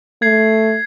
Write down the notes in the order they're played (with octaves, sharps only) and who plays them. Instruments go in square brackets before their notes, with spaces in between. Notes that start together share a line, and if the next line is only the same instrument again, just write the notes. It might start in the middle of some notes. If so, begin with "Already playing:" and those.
[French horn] A3 [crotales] G#6 C7